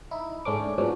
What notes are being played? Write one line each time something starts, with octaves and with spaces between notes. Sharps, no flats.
D#4 E4
G#2 A3 C#4 D4 D6
G#2 B2 F3 F#3 C#4 D4